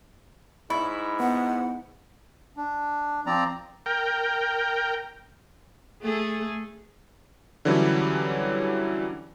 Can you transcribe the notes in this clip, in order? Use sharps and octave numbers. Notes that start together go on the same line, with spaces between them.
G#2 E4 B5 C#6
B3 F#5
D4
F3 C4 D5 A#5
A#4 G5
A3 G#4 A4
D3 E3 F#3 G3 C#4 E4